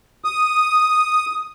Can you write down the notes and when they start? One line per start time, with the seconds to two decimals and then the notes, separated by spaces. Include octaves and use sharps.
0.25 D#6